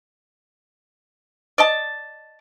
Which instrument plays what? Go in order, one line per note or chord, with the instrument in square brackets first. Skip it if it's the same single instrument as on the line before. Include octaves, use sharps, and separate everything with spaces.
[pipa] D5 D#5 A5